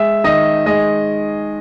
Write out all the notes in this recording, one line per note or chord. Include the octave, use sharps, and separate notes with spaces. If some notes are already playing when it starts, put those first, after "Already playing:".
Already playing: G#3 E5
D#3 D#5
G#3 D#5